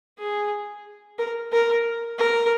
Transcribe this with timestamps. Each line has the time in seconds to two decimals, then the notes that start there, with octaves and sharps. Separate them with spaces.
0.19 G#4
1.19 A#4
1.53 A#4
2.19 A#4